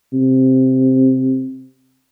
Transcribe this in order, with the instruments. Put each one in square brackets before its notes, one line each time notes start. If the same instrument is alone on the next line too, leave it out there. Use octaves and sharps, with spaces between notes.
[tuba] C3